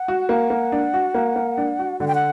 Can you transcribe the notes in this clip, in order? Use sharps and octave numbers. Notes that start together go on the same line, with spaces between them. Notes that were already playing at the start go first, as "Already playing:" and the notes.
Already playing: F#5
F#4
A#3 F#5
A#3
D4
F#4
A#3
A#3
D4
F#4
D3 F#5
G5
F#5